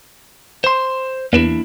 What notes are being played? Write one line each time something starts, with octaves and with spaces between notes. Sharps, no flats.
C5 C6
E2 A#3 D4 E4